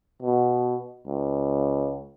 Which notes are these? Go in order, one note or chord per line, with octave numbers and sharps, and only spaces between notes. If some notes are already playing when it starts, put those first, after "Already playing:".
B2
C#2